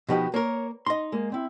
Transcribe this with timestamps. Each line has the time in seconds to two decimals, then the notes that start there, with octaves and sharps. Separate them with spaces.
0.09 B2 F3 D#4 F#4 G4 B4
0.34 A#3 A#4 C#5
0.86 D#4 D#5 C6
1.12 G#3 A#3
1.32 C4 E4